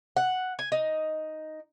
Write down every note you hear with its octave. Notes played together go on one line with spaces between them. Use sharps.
F#5
G#5
D#4